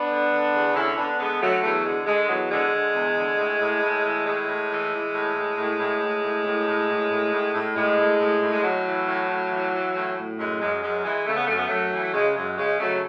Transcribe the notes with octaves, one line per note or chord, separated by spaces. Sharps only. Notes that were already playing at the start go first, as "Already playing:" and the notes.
Already playing: B3 D4
D3
D3
E2
D3 C#4 E4
D3 B3 D4
D3 G#3 B3
D3 F#3 A3
E2 F#3 A3
D3 G#3
D3 G#3
E2 F#3
D3 G#3
D3
E2
D3
A2
A2
A2
E3
A2 G#3
A2
E3
E3
A2
A2
A2
A2
A2
A2
A2
A2
A2
A2
A2
A2
A2 G#3
A2
A2
A2
G#3
A2 F#3
E3
A2
A2
E3
E3
A2
A2
F#2 G#3
F#2 G#3
F#2 G#3
E3 G#3
C#3 A3
B3
F#2 A3
B3
F#2 F#3 A3
E3
A3
C#3 G#3
F#2 G#3
C#3 G#3
C#3 F#3 A3